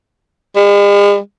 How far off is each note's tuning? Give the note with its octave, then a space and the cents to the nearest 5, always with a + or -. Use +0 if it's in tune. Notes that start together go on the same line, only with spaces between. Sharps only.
G#3 -45